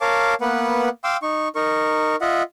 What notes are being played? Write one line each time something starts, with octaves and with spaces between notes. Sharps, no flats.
A#4 C#5 F5 A5 D6
A#3 B3 B4 F#5
F5 G5 C6 D6 E6
D#4 C#6
D#4 A#4 C#6
F4 D#5 E5 F#5